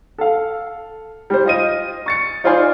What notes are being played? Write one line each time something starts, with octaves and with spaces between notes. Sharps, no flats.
A4 F5
G3 C5
F4 D#5 D#7
C#6 A6 C#7
D#4 F4 C5 D5 G#5 C6